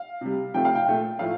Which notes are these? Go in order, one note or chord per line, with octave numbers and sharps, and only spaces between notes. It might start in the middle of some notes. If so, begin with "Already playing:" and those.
Already playing: F5
C3 G3
C3 F3 A3 G5
F5
G5
A#2 A3
A2 F3 A3 F5